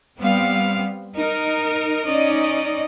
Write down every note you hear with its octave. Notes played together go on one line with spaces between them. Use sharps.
G3 B3 C4 F5
D#4 A#4
C#4 D#4 D5 D#5